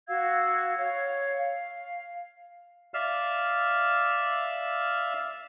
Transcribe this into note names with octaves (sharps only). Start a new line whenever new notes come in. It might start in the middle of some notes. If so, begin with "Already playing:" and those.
F#4 F5 E6 G#6
C#5 F5
F5
D5 E5 F5 E6 F6